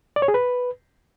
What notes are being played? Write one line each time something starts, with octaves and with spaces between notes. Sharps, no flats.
D5
C#5
G#4
B4